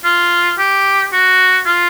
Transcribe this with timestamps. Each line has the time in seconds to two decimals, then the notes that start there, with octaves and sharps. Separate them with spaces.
0.04 F4
0.58 G4
1.13 F#4
1.66 F4